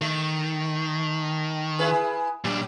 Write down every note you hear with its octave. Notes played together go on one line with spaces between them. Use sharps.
D#3 A3
E4 G#4 B4
A#2 F#3 D4